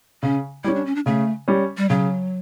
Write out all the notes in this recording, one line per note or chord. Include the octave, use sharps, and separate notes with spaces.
C#3 C#4
G3 C#4 E4
D4
C#4
D4
C#3 A3
G3 C#4
G3
C#3 F#3